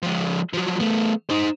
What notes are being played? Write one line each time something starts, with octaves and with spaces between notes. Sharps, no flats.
F3 G#3
F3 F#3
A3 B3
D#4 C5